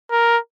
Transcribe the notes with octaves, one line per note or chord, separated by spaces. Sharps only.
A#4